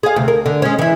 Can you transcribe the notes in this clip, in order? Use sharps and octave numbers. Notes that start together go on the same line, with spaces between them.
G#4 F5
D2 C3
A#4
D3
G#3 C#4
E3 E4